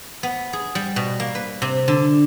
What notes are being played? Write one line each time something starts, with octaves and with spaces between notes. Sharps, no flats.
B3
G#4
G3
B2
A#3
B4
C3
D3